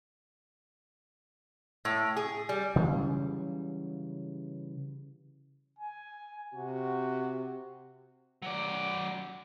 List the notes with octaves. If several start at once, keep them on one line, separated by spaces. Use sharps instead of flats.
A2
G#4
G3
C#3 E3 F#3 G3
G#5
C3 F#4
F#3 D5